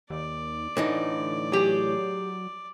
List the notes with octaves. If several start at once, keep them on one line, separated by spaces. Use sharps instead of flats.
D#2 D5
A2 D3 E3 D#4
F#3 G4 G#4